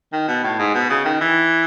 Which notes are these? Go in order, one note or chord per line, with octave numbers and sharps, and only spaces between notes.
D#3
B2
A2
G#2
B2
C#3
D#3
E3